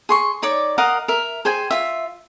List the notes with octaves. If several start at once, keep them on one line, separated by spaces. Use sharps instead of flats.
G#4 C6 C#6
D#4 C#5 D5 D6
A#4 D#5 F5 F#5
A#4 E5
G#4 C5 G5 G#5
F4 E5